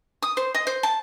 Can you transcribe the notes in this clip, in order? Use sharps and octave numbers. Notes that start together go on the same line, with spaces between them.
D#6
C5
D#5
C5
A5